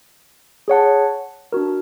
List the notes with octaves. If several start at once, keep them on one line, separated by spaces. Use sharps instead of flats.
G#4 C#5 F#5 A5
D4 F#4 A#4